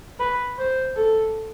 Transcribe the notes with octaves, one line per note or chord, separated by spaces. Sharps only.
B4
C5
A4